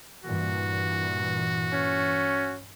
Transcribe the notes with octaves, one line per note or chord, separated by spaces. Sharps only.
G2 A#2 E3 F#4
C#4